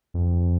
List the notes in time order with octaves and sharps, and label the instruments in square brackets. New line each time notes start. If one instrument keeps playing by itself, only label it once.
[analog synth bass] F2